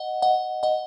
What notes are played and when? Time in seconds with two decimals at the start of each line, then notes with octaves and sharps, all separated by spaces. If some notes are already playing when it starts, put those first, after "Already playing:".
Already playing: D#5 F#5
0.22 D#5 F#5
0.63 D#5 F#5